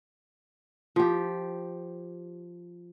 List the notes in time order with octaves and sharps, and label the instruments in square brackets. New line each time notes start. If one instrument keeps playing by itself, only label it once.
[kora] F3 G4